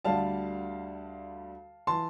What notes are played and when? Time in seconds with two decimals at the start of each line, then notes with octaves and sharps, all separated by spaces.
0.05 D2 D3 G3 F5 A5
1.87 E3 A5 C6